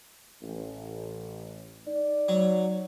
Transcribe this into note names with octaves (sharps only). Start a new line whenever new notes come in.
A1
D#4 D5
F#3